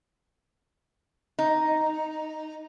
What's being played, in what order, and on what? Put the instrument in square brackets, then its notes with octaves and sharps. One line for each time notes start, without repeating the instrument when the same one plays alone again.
[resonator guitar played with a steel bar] D#4